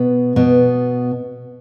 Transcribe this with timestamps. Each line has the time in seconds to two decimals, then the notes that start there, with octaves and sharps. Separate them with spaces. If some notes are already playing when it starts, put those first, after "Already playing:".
Already playing: B2 B3
0.36 B2 B3